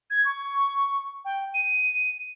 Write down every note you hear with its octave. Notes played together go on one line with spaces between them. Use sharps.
G#6
C#6
G5
D#7